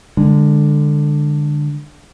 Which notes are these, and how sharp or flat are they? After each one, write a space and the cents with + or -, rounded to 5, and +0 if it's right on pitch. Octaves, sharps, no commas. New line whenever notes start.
D3 +10 G#3 -20